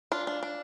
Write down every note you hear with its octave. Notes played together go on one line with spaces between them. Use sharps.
D4 F4
D4
D4